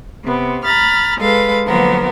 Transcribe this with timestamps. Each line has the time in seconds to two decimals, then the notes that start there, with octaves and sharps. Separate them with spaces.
0.23 C3 B3
0.63 A#5 B5 F6 A6
1.19 G#3 A4 B4 F5
1.65 D3 F3 F#3 A#3 B3 A#4